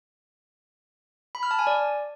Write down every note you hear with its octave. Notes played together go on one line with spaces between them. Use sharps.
B5
F6
A5
G#5
D5